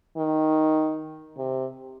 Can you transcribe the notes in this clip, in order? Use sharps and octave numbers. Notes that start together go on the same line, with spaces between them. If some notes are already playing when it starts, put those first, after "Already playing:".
D#3
C3